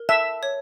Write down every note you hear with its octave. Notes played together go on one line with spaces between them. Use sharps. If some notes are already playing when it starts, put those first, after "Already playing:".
Already playing: A#4
E5 A5
C#5